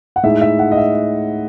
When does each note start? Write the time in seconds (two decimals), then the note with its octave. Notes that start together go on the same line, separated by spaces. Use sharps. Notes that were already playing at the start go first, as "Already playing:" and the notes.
0.16 F#5
0.23 A2 G#3 D#4 E5
0.42 E5
0.59 F#5
0.72 D#5
0.77 E5